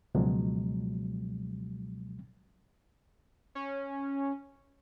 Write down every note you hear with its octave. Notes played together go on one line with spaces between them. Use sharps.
C#2 B2 F3 F#3 G#3
C#4